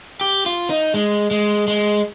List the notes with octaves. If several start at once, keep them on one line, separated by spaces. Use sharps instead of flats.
G4
F4
D#4
G#3
G#3
G#3